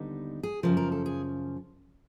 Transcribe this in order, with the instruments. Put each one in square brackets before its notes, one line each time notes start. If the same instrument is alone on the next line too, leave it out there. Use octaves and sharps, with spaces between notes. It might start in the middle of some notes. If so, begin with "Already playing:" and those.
Already playing: [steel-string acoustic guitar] D#2 D3 G3 B3 D#4
G#4
F#2 C#3 F3 A#4
A#4
A4
G#4